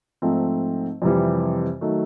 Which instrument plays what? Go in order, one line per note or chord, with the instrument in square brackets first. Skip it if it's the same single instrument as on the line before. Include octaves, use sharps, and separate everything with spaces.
[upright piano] G#2 F3 A3 C4 D#4
F2 C3 E3 G3
D#3 F#3 A3